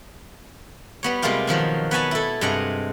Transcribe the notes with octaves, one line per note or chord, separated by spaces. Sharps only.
G3 B3 C#5
C3 G3 G#3 A#3 F4 G4
B2 D#3 F3 F#3
B3 B4 C#5 G#5 A5 B5
E4 A4
G2 C3 G#3 D#5 F#5